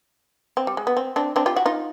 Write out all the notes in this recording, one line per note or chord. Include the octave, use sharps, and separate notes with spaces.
C4
G3
G#3
B3
C4
C4 D4
C4 D4
F4 G4
E4 F#4
D#4 F4